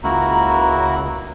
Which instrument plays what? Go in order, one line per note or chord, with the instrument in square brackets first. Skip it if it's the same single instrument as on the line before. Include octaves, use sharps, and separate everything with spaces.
[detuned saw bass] C#2 [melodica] A#3 E4 F#4 [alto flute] A#5